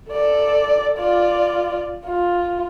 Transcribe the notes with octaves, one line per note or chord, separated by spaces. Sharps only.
A4 D5
F4 D5
F4